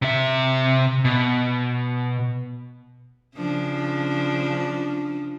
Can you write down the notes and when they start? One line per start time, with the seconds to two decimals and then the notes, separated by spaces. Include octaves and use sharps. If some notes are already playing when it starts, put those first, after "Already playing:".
0.02 C3 E5
1.05 B2
3.37 C#3 F3 D4